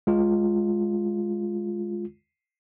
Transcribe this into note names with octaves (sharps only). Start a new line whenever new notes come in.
G#3 F4